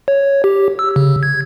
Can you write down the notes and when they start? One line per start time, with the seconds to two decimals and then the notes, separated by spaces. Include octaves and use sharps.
0.08 C#5
0.44 G4
0.79 E6
0.96 C#3
1.23 G#6